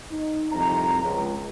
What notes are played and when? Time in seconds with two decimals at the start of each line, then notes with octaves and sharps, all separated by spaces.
0.12 D#4
0.52 C2 F2 C3 A#5
1.02 C#2